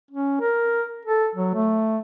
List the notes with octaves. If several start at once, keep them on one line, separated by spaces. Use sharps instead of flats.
C#4
A#4
A4
F#3
A3